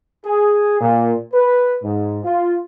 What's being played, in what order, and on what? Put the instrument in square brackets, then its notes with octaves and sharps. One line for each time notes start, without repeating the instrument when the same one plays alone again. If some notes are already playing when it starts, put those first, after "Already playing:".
[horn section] G#4
A#2
B4
G#2
F4